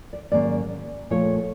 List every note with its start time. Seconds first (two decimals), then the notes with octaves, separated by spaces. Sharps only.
0.13 D5
0.32 G#2 D#3 F#3 A#3 C#4 D5
1.10 A#2 F3 A3 C#5